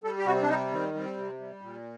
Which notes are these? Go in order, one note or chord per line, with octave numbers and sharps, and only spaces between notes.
G3 A4
G4
C3 F#4
C4
D4
G3 D#4
D#3 C4
G3 C4
C3
G3
A#2